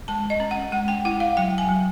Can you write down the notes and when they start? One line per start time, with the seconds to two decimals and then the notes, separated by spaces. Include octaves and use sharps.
0.08 G#3 A5
0.30 D#5
0.40 C#4
0.51 F#5
0.72 G#3 F#5
0.88 G5
1.05 E4 F#5
1.20 F5
1.37 F#3 G5
1.58 G#5
1.69 F#3